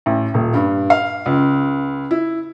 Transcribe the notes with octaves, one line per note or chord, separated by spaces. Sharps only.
A1
D#1
G2
F5
C#2
E4